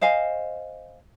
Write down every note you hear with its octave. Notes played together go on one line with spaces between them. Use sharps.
C5 D#5 F5 G#5